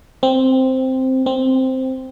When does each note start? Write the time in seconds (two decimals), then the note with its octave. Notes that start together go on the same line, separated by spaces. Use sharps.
0.23 C4
1.26 C4